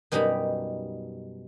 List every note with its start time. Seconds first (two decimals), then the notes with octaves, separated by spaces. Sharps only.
0.12 F#2 B2 G3 D#4 A#5 B5